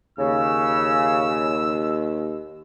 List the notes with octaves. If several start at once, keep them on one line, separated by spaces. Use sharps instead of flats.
D#2 C#3 E6